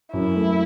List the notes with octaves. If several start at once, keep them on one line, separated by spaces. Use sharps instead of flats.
F#2 E4
A3